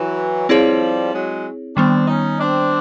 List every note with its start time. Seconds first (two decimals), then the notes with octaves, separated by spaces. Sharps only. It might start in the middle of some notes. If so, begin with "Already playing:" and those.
Already playing: E3 F#3
0.49 F3 G3 C4 E4 G#4 C#5
1.12 F#3 G#3
1.76 D#3 G3 B3 C4 D4
2.08 C#4 D#4
2.39 C4 D4